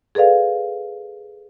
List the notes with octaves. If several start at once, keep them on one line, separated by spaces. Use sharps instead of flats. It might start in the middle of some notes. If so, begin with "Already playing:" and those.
G#4 A4 B4 D5 F5